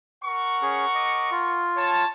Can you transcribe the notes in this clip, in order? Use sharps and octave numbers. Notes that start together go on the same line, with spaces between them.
A#4 F#5 C#6
C#4 G#4
D#5 D6
F4
C#5 A5